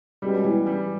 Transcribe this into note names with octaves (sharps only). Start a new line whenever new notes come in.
B2 G3 G#3 C#4 G4
E3
G3